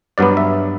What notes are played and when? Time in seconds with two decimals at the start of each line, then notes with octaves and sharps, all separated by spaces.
0.18 G2 F#3 B3 D5
0.37 E5